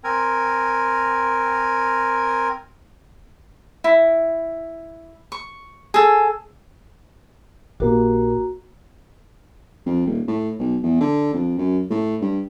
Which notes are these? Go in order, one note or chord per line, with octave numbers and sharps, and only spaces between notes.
C4 A#4 G#5
E4
C#6
G#4 A4
A#1 A#3 F#4 G4 A#5
F2
D#1
A2
B1
E2
D3
F2
F#2
A2
G2